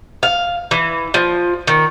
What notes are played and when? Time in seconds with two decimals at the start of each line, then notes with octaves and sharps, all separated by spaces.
0.23 F5
0.71 E3
1.14 F3
1.67 D#3